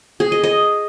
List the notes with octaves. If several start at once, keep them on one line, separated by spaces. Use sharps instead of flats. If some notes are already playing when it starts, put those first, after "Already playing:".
G#4
D#5
D#5